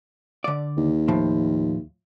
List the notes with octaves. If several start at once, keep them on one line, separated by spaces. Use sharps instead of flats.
D3 D5
D#2
A2 F3